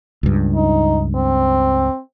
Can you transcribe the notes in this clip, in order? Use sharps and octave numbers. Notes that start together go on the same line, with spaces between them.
C#2 G2
D#4
C4